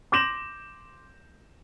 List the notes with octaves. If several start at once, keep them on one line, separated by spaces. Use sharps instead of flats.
C6 D6 G6 A#6 E7 F#7